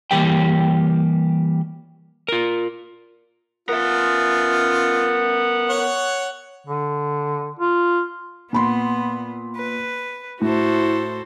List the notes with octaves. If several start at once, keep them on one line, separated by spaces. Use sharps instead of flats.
E3 G3 A#3 G4 G5
F4 A#4
B3 F4 A#4 E5
C#5 F#5
D3
F4
A#2 B3 B5 C6
B4
A2 E4 F#4 A4 C5